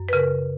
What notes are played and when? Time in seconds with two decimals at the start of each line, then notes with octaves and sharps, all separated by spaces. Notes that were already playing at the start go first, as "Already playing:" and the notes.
Already playing: F#2
0.09 B4
0.13 C#3 A#4